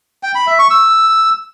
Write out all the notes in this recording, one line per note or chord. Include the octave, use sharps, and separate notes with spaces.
G5
B5
E5
C#6
E6